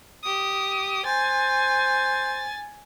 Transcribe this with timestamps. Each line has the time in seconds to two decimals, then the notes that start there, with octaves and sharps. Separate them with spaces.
0.23 G4 D#6
1.06 C5 G#5 A6